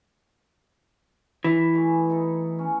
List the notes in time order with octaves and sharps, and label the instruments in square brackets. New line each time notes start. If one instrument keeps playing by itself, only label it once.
[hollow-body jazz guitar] E3 [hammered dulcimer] B4
[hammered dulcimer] B2 A3 G#4
D#4 E4 A4
C#4